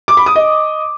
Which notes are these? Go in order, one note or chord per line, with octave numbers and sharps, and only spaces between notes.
D6
B5
D#6
D#5